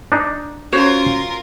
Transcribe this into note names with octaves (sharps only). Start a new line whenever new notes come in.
D4 D#4
C#4 F4 F#4 A#4 C5 C#5